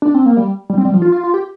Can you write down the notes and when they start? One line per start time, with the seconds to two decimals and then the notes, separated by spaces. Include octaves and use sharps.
0.02 D4
0.14 C4
0.26 A#3
0.37 G3
0.70 G3
0.78 C4
0.85 G3
0.93 F3
1.02 F4
1.12 F4
1.24 F4
1.34 G4